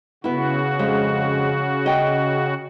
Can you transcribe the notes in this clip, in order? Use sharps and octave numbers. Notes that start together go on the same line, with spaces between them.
C#3 B3 E4 F#4
F2 G#3
D#5 G5